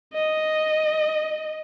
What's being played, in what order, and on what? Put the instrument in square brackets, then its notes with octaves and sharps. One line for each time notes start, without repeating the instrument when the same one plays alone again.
[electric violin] D#5